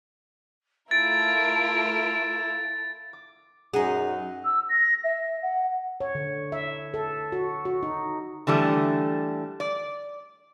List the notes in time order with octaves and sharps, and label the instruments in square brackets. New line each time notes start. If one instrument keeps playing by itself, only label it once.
[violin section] A3 F4 A#4 [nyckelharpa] E4 [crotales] A6 [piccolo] D7
[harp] D6
[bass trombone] F#2 [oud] D#4 G#4 [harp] F#5
[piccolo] E6
A#6
E5
F#5
[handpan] C#5
D3
E5
A4
F#4
F#4
D#4
[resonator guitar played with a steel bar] D3 E3 G3 A3
D5